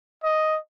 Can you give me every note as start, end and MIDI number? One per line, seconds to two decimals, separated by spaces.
0.24 0.58 75